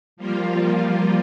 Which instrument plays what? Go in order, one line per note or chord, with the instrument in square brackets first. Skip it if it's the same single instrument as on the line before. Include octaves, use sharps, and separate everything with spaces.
[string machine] F3 G3 A#3 F4